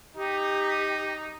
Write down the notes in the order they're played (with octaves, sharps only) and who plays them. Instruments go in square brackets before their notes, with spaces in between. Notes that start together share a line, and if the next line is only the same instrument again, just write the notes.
[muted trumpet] D#4 [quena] G4